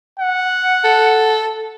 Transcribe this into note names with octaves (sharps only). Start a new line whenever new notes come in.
F#5
A4